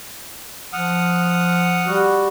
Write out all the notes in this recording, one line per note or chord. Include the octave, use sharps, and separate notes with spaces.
F3 F#5 D#6 F6
G3 F#4